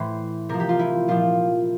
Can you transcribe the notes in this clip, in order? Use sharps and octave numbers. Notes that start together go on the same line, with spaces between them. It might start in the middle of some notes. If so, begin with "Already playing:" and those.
Already playing: A2 E3 C5
C3 F3 A#4
G4
F4
E4
A#2 F3 F4